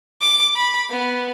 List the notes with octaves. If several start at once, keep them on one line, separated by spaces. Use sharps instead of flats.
D6
B5
B3